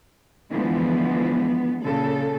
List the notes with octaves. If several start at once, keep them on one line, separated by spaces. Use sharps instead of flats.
D3 E3 F3 G#3 B3
A#2 C#3 A4